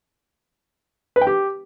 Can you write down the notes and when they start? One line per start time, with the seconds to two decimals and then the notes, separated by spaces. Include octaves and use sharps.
1.16 B4
1.21 G5
1.27 G4